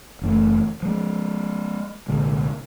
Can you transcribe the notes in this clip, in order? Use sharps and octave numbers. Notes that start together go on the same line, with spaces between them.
F#1 E3 A3
F3 G#3
C2 A#2 D3 G#3